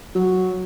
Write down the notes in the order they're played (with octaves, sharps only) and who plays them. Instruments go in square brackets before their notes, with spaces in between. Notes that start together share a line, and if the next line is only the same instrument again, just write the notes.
[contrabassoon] F#3